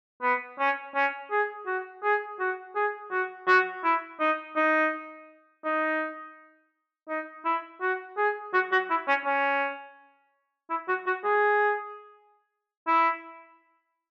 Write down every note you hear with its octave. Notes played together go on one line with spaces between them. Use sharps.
B3
C#4
C#4
G#4
F#4
G#4
F#4
G#4
F#4
F#4
E4
D#4
D#4
D#4
D#4
E4
F#4
G#4
F#4
F#4
E4
C#4
C#4
E4
F#4
F#4
G#4
E4